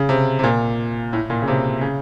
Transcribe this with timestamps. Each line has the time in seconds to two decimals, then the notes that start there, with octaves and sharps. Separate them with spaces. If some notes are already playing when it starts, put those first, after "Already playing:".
Already playing: C#3
0.09 C3
0.39 C3
0.43 A#2
1.13 A2
1.30 A#2
1.42 C#3
1.48 C3
1.81 C#3